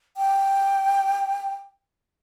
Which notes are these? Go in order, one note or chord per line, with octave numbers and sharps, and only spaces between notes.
G5